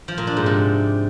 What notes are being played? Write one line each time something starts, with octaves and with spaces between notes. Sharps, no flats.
F3
A#2
D4
G#2
C3